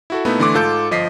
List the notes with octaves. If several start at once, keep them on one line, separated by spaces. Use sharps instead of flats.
E4 F#4 A4
A#2 A3 B3 D#4 E4
D3 E3 A3 C6 D6
G#2 F4 A4 G6
G1 F3 D#5 B6 C7